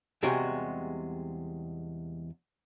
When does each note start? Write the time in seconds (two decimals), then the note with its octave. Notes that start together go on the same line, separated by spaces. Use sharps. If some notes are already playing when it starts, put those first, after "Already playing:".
0.23 E2 C3 G3 G#3 F#4 G5